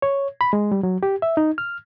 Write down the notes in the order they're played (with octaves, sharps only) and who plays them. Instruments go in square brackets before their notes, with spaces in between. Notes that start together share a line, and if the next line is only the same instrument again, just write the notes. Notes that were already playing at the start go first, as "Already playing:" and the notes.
[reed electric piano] C#5
B5
G#3
G3
F#3
G4
E5
D#4
F6